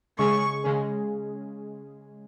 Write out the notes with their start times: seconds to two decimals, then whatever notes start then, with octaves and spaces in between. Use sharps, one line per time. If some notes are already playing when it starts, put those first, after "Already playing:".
0.18 C#3 G#3 C#4 G#4 C#6
0.64 C#3 G#3 C#4 G#4